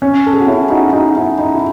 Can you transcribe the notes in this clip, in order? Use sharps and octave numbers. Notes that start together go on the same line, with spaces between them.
C#4
A4
G#4
F#4
C#4 E4
D#4 F#4
D#4 F#4
C#4 E4
D#4
E4